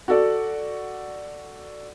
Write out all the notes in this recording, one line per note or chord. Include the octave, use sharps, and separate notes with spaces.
F#4 A4 D5